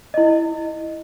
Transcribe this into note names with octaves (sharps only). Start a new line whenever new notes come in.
E4 D#5